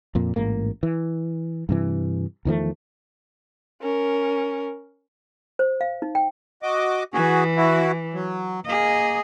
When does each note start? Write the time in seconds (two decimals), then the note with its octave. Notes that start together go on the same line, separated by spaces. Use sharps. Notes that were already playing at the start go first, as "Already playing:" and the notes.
0.15 F2 A#2
0.36 A1 G#2 A#3
0.83 E3
1.69 G2 C3 E3
2.45 E2 D#3 F3 A3
3.81 C#4 A#4
5.59 C5
5.81 F5
6.02 D#4
6.15 G5
6.63 F#4 D#5 D6
7.14 E3 F#4 G#4
7.57 E4 F#4
8.14 F#3
8.66 A#3 G#4 D#5